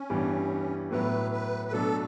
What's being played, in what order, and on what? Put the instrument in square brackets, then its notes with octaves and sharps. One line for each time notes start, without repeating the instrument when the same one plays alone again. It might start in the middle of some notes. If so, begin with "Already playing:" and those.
Already playing: [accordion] C#4
[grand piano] G2 E3 G3 B3
[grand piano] A2 F#3 B3 E4 [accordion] B4
[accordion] B4
B4
[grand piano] B2 F#3 A3 D4 [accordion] A4